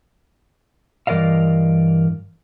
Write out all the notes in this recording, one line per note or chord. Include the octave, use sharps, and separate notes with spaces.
G2 E3 A#4 D5 D#5 F5